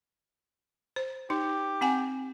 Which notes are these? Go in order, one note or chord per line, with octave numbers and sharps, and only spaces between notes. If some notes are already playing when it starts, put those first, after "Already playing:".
C5
D#4 G4
C4 F#5 G#5